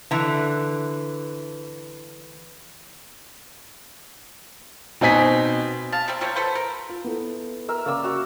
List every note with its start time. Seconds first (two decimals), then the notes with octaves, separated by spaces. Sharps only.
0.11 D3 E3
5.01 B2 C4 D#4 G#5 B6
5.92 F5 A5
6.08 C3 G3 C4
6.21 F3 F#3 A#3 C4
6.36 A4 B4 C5
6.55 A#4
6.89 F4
7.04 B3 E4 A4
7.69 A#4 E5
7.86 C#3 A#3 D5 E6
8.04 F#4 E5